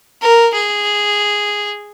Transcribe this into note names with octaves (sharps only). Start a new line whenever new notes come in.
A#4
G#4